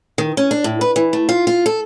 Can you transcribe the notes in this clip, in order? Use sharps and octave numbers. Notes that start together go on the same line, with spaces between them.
D#3
C#4
D4
A2
B4
E3
A3
F4
F4
A4